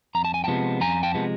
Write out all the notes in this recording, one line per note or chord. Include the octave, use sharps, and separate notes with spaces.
F2 A#5
A5
G#5
C3 F3 G#3 B3 G5 A5
F2 G#5 A#5
G5 A5
C3 F3 G#3 B3